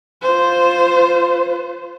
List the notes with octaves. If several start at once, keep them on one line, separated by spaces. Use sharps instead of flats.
F4 C5